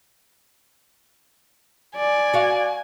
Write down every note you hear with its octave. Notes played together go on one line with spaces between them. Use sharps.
D5 G#5
F#4 F5